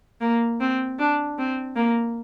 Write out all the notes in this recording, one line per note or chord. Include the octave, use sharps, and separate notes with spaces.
A#3
C4
D4
C4
A#3